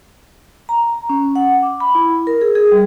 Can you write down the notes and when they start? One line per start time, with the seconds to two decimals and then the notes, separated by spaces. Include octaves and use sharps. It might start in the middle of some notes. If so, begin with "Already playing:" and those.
0.69 A#5
0.94 A#5
1.09 C#4
1.36 F#5
1.62 D6
1.80 B5
1.95 E4
2.27 A#4
2.41 G#4
2.55 G#4
2.72 G3